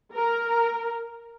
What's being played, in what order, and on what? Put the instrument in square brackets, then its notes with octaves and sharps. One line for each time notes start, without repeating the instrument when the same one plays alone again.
[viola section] A#4